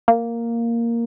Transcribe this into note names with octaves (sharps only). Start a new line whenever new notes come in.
A#3